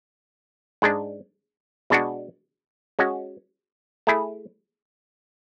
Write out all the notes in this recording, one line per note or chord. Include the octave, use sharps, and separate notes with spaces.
G#2 G#3 D4
B2 G#3 D4 F#4
G#3 C#4 F#4
A3 E4 G#4